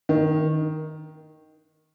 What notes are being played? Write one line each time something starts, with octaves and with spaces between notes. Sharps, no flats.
D#3